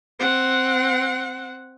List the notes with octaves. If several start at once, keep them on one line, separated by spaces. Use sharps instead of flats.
C4 F#5